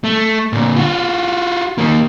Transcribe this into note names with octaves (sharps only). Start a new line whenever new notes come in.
A3
A#2 D3
F4 F#4
D#3 A#3